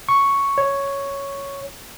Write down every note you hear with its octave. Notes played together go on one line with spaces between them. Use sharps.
C#6
C#5